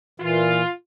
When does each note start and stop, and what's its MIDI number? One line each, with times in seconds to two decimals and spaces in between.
0.20 0.62 46
0.20 0.62 52
0.20 0.69 65